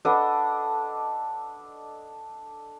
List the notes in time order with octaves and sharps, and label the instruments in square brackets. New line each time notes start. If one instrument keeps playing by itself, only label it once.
[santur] D4 A4 D#5 [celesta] B4 F#5 B5